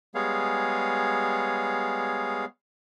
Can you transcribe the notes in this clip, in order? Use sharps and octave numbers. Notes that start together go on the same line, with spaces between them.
G3 G#3 B3 G#4 C#5 F5